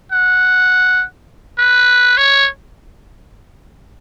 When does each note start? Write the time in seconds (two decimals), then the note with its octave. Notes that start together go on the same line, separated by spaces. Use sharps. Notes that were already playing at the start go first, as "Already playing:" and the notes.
0.12 F#5
1.59 B4
2.17 C#5